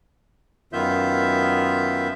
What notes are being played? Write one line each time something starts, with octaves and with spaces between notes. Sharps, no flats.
F#2 D#3 B3 F4 E5 G6